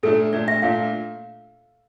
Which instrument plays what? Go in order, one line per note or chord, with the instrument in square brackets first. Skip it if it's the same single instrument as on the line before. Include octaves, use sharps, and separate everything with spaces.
[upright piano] A#2 A3 D4 [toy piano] A4
[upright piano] A#2 A3 D4 [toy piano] D5
[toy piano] E5
[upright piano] A#2 A3 D4 [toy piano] F5